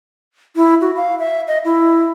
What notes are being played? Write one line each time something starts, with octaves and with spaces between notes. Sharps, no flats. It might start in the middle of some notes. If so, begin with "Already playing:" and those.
E4
F#4
F5
E5
D#5
E4